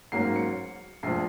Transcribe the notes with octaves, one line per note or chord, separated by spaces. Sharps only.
G#2 F#3 A#3 C#4 C7
C#7
A#1 A#2 F3 C7